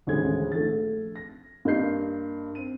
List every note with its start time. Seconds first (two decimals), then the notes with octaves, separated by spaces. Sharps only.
0.07 D#1 A1 D2 A2 G#3 G#6
0.52 A#1 A3 A6
1.16 A#6
1.65 G2 A#3 D#5 C6 G6 C7
2.55 C4 D#7